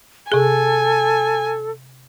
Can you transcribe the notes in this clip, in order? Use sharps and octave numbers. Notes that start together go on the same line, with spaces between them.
C3 G#4 A4 G#5